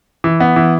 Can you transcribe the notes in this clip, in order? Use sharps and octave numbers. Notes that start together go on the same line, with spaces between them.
E3
B3
E3